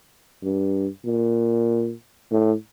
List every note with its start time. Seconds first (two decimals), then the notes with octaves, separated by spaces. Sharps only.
0.43 G2
1.05 A#2
2.31 A2